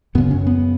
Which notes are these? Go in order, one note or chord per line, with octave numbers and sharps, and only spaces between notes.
F#2 C#3 B3
C#4
B3